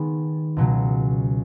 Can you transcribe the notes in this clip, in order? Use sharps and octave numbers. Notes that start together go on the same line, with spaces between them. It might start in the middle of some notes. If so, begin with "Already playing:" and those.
Already playing: D#3 G#3 B3
C#2 B2 F#3